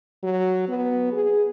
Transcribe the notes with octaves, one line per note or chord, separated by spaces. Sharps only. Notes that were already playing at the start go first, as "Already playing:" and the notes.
F#3
B3
G#4